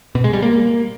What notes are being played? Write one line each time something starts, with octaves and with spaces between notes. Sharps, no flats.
B2
G#3
G3
A#3